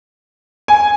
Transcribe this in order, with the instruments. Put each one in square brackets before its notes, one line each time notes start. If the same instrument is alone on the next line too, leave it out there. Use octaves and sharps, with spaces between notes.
[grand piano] G#5